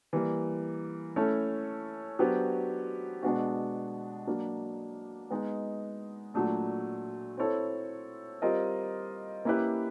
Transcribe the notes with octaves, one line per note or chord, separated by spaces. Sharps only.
E3 G3 A#3
A3 C#4 E4 A4 C#5
F#3 B3 D4 G4 C5
B2 G#3 B3 D4 F#4
F#3 A#3 D4
G#3 B3 D#4
A#2 F#3 A3 D4
C4 E4 A4 C#5
G3 C4 F4 A#4 D#5
A#3 C#4 E4 G4 B4